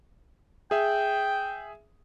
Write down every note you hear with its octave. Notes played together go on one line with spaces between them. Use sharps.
G#4 E5 G5